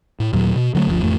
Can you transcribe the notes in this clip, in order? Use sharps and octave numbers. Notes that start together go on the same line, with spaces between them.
A2
D#2 A#2 F#3
B2
D3 F#3 G#3 A3
G1 D2 F3
A1 F2 A3